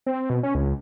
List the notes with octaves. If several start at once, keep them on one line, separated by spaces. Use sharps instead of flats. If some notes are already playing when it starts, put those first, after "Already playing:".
C4
B2
C#4
C#2